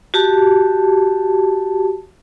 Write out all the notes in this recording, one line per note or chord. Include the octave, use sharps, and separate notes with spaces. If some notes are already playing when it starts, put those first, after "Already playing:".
F#4 G4 A5